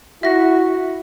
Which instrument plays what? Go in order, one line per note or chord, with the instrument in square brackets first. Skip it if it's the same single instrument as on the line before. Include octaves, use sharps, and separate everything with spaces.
[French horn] E4 [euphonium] F#4 [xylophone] E5 A#6